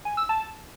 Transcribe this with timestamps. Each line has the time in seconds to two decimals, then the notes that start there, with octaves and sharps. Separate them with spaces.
0.05 G#5
0.17 E6
0.29 A5